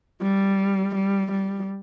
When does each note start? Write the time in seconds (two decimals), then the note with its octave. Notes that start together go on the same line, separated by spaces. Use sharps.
0.22 G3
0.95 G3
1.32 G3